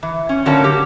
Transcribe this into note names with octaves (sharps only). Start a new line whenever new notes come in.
E3
C#4
A2 D3 F#3 A#3 C#4 A5
G4